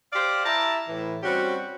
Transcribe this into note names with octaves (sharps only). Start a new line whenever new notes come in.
G4 C5 D5 F5
E4 E5 A5 A#5
A2 E3
G3 C4 C#4 F#4 G4